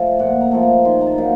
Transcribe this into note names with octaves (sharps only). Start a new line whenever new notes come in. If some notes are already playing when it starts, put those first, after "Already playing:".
Already playing: F3 A3 A5
A#2 F#5
A#5
F3 A3
A#5
D#3 C6
A#5
A5
F#3 A#3 D#4